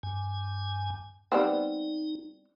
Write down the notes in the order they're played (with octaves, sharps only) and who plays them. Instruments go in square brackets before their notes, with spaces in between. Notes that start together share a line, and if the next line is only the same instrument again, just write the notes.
[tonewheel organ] G2 G#5
[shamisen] G3 B3 C4 [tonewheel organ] D#4